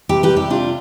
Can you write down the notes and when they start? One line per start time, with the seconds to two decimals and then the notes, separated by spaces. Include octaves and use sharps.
0.09 C3 G4 B4
0.23 G4 B4
0.30 G3
0.37 E4 G4
0.50 C3 D4 F4